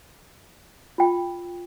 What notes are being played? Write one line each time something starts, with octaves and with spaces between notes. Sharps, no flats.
F4 G5